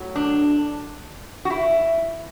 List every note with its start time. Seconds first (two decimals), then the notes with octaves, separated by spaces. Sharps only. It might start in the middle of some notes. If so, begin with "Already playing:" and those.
Already playing: A2 F#3
0.15 D4
1.45 F#4
1.50 E4